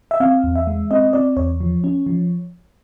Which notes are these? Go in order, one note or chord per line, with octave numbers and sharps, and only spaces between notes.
E5
C4 F5
E2
E5
G#3
C4 D#5
C4 D5
E2 C#5
F3
C#4
F3